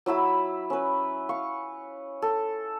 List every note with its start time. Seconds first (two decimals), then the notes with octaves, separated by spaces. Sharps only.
0.06 F#3 E4 E5 B5
0.70 C#4 B4
1.29 F5 C#6
2.22 A4